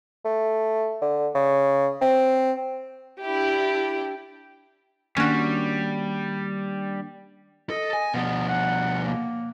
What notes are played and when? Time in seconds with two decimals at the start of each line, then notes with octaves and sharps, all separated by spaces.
0.25 A3
1.02 D3
1.34 C#3
2.01 C4
3.23 D4 E4 G4
5.17 D#3 G3 A#3 C#4 D4 F#4
7.70 A4 D#5
7.93 G#5
8.14 B2 F3 B3
8.49 F#5
9.06 A#3